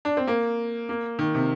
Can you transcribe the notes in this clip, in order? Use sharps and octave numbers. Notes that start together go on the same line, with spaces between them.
D4
C4
A#3
A#3
D#3
C3